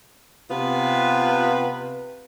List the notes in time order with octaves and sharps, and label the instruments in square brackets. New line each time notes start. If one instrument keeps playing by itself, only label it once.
[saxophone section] C3 B3 F4 B4